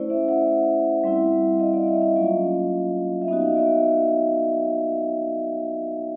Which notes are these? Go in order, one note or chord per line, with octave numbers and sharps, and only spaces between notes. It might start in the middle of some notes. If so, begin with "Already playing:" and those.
Already playing: A3 C#4 E4 C5 D5
D5 E5
E5 F#5
G3 C4 E4
D#5 F5
D5 E5
D5 E5
D#5 F5
F#3 A#3 C#4 F4
E5
B3 D#4 F#4 D#5 F5
D5 E5